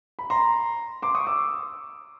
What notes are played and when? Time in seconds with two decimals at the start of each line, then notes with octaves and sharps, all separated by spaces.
0.19 B5
0.30 A#5 C6
1.02 C6 D6
1.15 C#6 D#6
1.27 D6 E6